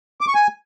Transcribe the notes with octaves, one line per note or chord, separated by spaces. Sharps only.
D6
C#6
G#5